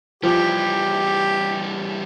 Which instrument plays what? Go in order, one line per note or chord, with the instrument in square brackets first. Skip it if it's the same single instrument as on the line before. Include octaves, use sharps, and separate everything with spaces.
[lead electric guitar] E3 G3 [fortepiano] F3 [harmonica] G4